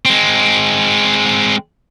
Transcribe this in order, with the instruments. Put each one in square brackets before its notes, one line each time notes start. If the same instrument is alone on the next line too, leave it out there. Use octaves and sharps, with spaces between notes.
[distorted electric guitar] G#3 C4